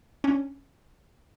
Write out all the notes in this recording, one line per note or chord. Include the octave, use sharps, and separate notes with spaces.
C#4 D4